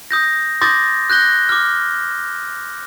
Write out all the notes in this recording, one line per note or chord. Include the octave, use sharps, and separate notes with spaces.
D#6 G6 A#6
C6 D6 D#6 G6 A6 A#6
F#6 G6 A#6 G7
D6 F6